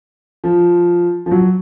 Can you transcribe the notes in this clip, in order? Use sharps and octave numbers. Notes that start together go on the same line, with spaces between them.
F3
F3
F#3